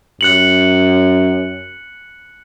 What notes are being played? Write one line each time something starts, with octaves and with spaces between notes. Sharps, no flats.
F#2 F#6 C#7 F#7